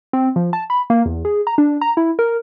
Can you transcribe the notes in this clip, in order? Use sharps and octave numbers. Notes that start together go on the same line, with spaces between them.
C4
F3
A5
B5
A#3
E2
G#4
A#5
D4
A#5
E4
A#4